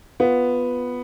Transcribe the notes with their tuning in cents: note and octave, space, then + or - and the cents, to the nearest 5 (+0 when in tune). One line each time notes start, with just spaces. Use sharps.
B3 +0 F4 +0